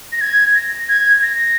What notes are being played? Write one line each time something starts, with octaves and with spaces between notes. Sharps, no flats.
A#6
G#6
A#6
G#6
A#6